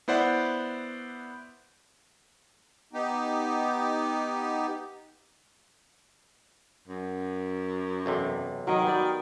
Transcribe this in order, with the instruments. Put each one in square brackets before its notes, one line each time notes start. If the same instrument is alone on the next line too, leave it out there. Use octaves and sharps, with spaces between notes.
[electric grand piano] B3 E4 C5 D5 F#5
[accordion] B3 D#4 G4
[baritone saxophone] F#2
[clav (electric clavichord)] B1 E2 C3
[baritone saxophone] D#3 [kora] F#3 D#5
[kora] B3 G4 D5